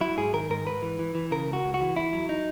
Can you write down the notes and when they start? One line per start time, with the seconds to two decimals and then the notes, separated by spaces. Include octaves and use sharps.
0.01 F#3 E4
0.17 G#2 G#4
0.33 D#3 A#4
0.50 G#2 A#4
0.66 G#2 B4
0.82 E3
0.99 E3
1.15 E3
1.31 C#3 A#4
1.47 C#2
1.53 F#4
1.64 C#2
1.74 F#4
1.81 E3
1.96 E2 E4
2.13 F#3
2.29 D#4